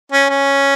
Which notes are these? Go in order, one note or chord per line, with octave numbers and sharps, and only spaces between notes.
C#4
C#4